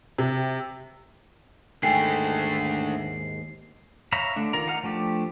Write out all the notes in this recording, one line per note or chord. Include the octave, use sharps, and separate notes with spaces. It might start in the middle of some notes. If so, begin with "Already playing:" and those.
C3
D#2 G#2 D3 A3 G5 G#5 C7
C#5 E5 F5 A#5 B5
D3 A3 D4
D#3 F4 A#4 D5 A#5
D#4 F5 F#5 A#5 F6
F3 A3 D4 G4